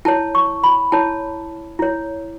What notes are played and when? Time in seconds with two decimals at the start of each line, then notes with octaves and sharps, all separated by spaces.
0.05 E4 C#5 A5
0.35 C#6
0.63 B5
0.92 E4 C#5 A5
1.79 E4 C#5